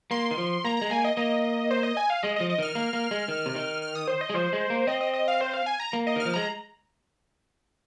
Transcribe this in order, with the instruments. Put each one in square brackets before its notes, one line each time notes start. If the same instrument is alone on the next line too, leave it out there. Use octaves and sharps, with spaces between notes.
[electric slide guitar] A#3 [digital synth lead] C6
[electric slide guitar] D#3
F3
[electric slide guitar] A#3 [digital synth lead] A#5
[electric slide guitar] G#3 [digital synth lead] A#5
[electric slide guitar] A#3 [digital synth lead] G#5
[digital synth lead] D#5
[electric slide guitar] A#3 [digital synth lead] D#5
[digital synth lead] C5
D#5
G#5
F5
[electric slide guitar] G#3 [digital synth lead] D#5
[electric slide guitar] F3 [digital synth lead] D#5
[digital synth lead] D#5
[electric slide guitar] D#3 [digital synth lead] F6
[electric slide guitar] A#3
A#3
G#3
D#3
C3
D#3
[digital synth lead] F6
D#6
C5
D#5
[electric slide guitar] G#3
[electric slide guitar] F3 [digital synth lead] C5
[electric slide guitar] G#3
A#3
[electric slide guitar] C4 [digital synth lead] D#5
[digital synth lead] D#5
D#5
F5
C5
F5
G#5
A#5
[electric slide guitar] A#3
[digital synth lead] D#5
[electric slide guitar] D#3 [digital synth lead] F6
[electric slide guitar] F3
[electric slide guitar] G#3 [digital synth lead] A#5